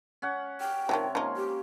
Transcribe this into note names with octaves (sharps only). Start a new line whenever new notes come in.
C#4 F#5
G5
C3 D#3 F3 F#3 C#5
F3 A#3 C#4 D#4 C6
G4